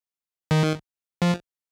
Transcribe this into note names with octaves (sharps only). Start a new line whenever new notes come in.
D#3
F3